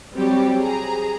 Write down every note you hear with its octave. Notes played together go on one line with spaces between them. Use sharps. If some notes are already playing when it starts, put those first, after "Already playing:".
F#3 G3 C4 G4 C#5
G#4 A#5